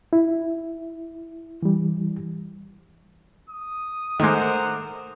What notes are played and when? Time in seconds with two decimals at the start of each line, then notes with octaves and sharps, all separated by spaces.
0.13 E4
1.63 E3 G3
3.50 D#6
4.20 D#3 G#3 A3 A#4 C5 F#5 D6